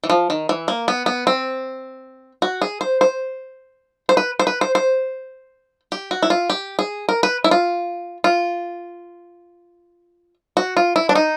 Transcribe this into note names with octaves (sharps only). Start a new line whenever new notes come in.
E3
F3
D#3
E3
A#3
B3
B3
C4
F#4
G#4
C5
C5
C5
B4
C5
B4
C5
C5
G4
F#4
E4
F4
G4
G#4
A#4
B4
E4
F4
F4
F#4
F4
E4
D4
D#4